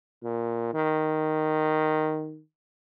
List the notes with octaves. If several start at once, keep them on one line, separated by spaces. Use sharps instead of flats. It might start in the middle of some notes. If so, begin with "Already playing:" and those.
A#2
D#3